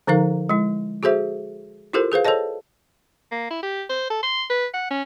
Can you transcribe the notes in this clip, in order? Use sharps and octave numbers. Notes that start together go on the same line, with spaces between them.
D3 F3 D#4 A#4 F5
G#3 E4
F#4 G#4 A4 C5 E5
E4 F4 G4 A4 A#4 C5
G#4 B4 C5 F5
A4 C5 C#5 D#5 A5
A#3
E4
G4
C5
A4
C6
B4
F#5
C#4